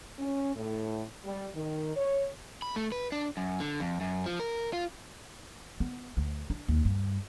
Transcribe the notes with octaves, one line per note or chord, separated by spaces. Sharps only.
C#4
A2
G3
D#3
C#5
B5
A3
B4
D4
F#2
D3
F2
F#2
F3
A#4
F4
B3
D2
D4
D#2
G2